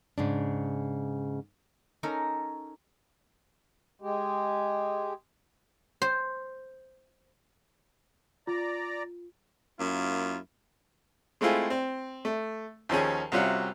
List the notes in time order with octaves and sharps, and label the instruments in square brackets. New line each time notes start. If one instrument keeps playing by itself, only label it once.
[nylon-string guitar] G#2 C#3 D4
[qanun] C#4 D#4 A4 A#4
[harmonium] G#3 G4
[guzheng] C5
[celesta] F4 [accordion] D5 A#5
[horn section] F#2 A#3 E4 F4
[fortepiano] G#3 A3 C4 E4 F4 G#4
C4
A3
D#2 F3 C#4 G#4
C2 C3 C#4 F4 F#4